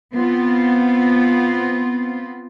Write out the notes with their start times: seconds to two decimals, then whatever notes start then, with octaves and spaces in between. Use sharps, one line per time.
0.14 B3 C4 F4